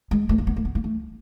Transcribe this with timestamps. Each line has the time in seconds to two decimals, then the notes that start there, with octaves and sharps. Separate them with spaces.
0.11 G#3
0.29 A3
0.38 A#3
0.47 B3
0.56 A#3
0.65 B3
0.75 A#3
0.84 A3